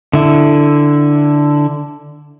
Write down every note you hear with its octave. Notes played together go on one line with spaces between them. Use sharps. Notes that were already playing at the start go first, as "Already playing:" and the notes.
D3 E4